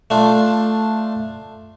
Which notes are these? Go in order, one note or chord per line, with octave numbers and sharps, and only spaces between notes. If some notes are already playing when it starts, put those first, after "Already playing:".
A3 D4 F4